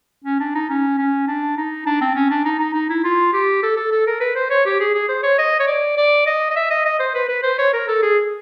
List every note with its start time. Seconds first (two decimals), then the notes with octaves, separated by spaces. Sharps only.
0.25 C#4
0.40 D4
0.55 D#4
0.70 C#4
0.98 C#4
1.28 D4
1.57 D#4
1.86 D4
2.01 C4
2.15 C#4
2.30 D4
2.45 D#4
2.59 D#4
2.74 D#4
2.90 E4
3.04 F4
3.33 G4
3.63 A4
3.76 A4
3.92 A4
4.07 A#4
4.20 B4
4.36 C5
4.51 C#5
4.66 G4
4.80 G#4
4.95 G#4
5.09 C5
5.23 C#5
5.38 D#5
5.60 C#5
5.67 D5
5.97 D5
6.27 D#5
6.50 D#5
6.56 E5
6.71 D#5
6.86 D#5
7.00 C5
7.15 B4
7.29 B4
7.43 C5
7.58 C#5
7.73 A#4
7.88 A4
8.02 G#4